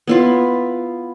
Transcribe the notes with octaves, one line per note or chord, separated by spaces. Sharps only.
B3 E4 F4